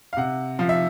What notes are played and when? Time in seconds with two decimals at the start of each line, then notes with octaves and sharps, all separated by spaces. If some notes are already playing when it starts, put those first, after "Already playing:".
0.13 F5
0.17 C3 F#5
0.59 F3 F5
0.69 E5